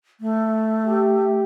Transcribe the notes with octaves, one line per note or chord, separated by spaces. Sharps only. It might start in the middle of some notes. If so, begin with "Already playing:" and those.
A3
G4